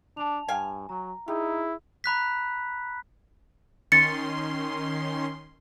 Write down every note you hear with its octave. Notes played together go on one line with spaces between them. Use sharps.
D4 A5 F7
G2 F5 G5 G#5
F#3 A#5
D#4 E4 G4 G#4
A#5 B5 F#6 B6
D#3 C#4 C6 A6 C#7